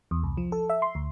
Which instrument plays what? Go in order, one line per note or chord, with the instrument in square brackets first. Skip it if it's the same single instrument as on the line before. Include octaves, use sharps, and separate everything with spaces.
[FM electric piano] E2
C2
F3
A4
E5
C6
D2